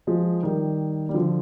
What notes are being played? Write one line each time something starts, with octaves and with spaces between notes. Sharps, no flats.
F3 G#3
D#3 G3
G3
D3 F3